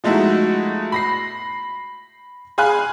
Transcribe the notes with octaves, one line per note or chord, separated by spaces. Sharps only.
F3 G#3 A3 D#4 E4 F#4
B5 A#6 C7
G#4 F5 G#5 B5 F#6